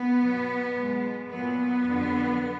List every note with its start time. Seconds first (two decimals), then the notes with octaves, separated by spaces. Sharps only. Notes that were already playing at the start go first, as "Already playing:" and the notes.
Already playing: B3
0.18 B2 F#3
0.73 B2
0.78 G#3
1.29 A#2 F#3 B3
1.85 F2 D3 F#3